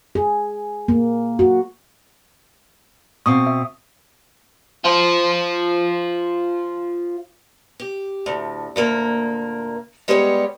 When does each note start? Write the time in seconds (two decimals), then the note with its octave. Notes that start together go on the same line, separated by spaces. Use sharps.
0.15 G#4
0.88 A#3
1.39 F#4
3.26 B2 C4 F5 C#6 D#6
3.46 E5
4.84 F4 C5
7.80 G4
8.26 D2 A2
8.76 D2 A#2 A#3
10.08 G3 G#3 B3 G4 B4 C#5